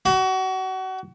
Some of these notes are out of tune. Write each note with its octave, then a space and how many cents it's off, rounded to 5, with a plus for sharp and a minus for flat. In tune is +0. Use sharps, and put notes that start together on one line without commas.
F#4 +30